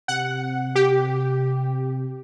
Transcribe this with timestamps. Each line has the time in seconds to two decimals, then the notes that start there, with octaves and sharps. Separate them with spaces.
0.08 C3 F#5
0.75 G4